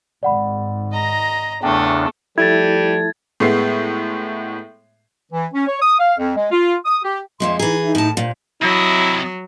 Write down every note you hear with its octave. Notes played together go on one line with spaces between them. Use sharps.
G#1 G#2 D5 F#5 B5
D#5 A#5
E2 C#3 A3 D4 G5
F3 G3 A3 E4 A4 G#6 A6
A2 G#3 B3 E5 C7
E3
C#4
C#5
D#6
F5
F2
G#3
F4
D#6
G4
F2 A#2 G#3 E5 C6
E3 D#4 E4 G#4 A#5
D#4 E5
A2 A5
A#2 C5
C3 F#3 E4 D#5